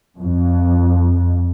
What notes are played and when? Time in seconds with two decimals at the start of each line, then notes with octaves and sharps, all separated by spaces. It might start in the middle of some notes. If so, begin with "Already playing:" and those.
0.19 F2